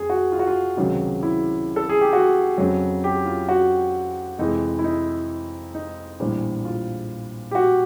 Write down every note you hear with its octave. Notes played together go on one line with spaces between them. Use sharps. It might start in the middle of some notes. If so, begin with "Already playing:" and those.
Already playing: F2 G#4
F#4
F4
F#4
F4
C#2 C3 D#3 F#3
E4
A4
G#4
G4
F#4
F2 C#3 F#3
G4
F4
F#4
F2 C3 E3 G#3 D#4
E4
D#4
D#4
A#1 A2 E3 G3
F4
G4
F#4